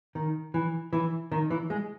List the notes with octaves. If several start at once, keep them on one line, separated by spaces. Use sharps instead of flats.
D#3
E3
E3
D#3
E3
G#3